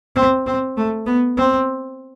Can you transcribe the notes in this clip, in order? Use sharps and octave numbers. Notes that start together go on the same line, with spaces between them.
C4
C4
A3
B3
C4